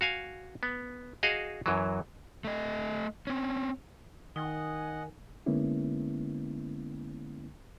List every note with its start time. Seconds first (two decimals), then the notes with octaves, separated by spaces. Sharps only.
0.01 F#4 F5 G#5
0.63 B3
1.23 F#4 G#4 D#5 F5
1.66 F#2 E3 F#3
2.45 A3 D#5
3.27 C4 C#4
4.36 D#3 D#4 D#5 F#5 G#5
5.46 D3 G#3 A#3 B3 C#4 E4